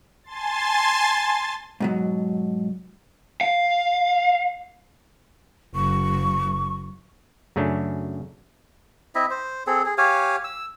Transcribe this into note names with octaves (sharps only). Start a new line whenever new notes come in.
G#5 A5 C6 A6
G#2 B2 F#3
F5
F#1 C#6
F#2 C#3 A3 C#4 D4
C4 E4 D#5 E5
C5
C4 G#4 A4
G#4
G4 C#5 F5 G#5
E6